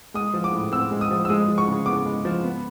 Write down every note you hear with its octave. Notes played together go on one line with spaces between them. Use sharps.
G#3 D#6
F3
D6
A2
C4 E6
G#3
D#6
F3
E6
G#3 D#6
F3
C#6
C#3
B3 D6
G#3
F3
B3